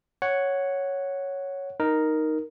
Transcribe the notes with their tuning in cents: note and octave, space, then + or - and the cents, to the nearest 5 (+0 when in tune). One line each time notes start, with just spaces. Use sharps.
C#5 +0 F#5 +0
D#4 +0 A#4 +0